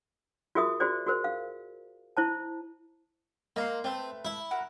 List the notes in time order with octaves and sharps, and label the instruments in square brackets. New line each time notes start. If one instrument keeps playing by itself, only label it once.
[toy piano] F4 F#4 G#4 A#4 E5 D#6
F4 F#4 G#4 C5 D5
F#4 G#4 A#4 C5
F5
E4 C5 A5
[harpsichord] A#3 [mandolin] D#4 A#5 C6
[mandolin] A3 B4 [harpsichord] C4
[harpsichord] E4 E5
[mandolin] F#4 A#4 F#6